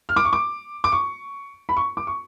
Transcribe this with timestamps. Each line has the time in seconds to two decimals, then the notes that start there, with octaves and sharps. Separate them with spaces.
0.09 F6
0.16 D6
0.25 C#6
0.33 D6
0.84 D6
0.92 C#6
1.69 B5
1.77 C#6
1.97 D6
2.07 C#6